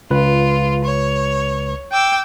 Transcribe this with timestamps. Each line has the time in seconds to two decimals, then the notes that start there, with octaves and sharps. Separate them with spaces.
0.11 C#2 F4 B4
0.84 C#5
1.92 G5 D6 E6